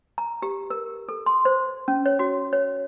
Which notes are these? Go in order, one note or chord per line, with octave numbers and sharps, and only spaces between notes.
A#5
G4
A#4
A4
C6
C5
C#4
C#5
F#4
C#5